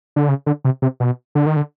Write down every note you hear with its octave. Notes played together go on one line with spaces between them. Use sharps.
D3
C#3
D3
C3
C3
B2
D3
D#3
D3